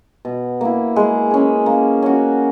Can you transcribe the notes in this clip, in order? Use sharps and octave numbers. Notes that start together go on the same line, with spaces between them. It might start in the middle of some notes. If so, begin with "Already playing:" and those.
B2
A#3 E4
G#3
C#4 G#4
A#3
C#4 F#4